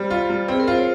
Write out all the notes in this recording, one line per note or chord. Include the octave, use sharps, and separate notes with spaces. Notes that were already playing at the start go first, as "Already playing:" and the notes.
Already playing: G3 C5
F4
G3
C4 G#4
A#4
F4 C5
C#5